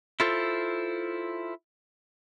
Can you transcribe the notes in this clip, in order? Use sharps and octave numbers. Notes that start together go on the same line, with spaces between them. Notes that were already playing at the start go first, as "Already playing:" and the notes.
E4 F4 A4 C5